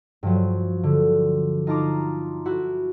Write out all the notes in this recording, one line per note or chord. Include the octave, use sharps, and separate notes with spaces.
G2 F3 F#3
D3
D#4 F4 A5 A#5 D6
E4 F#4